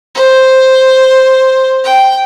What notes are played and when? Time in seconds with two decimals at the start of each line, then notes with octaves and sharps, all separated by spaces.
0.15 C5
1.84 G5